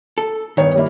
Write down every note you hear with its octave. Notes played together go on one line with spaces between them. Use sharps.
A4
G2 D#3 B3 C#5
G3 A#3 E4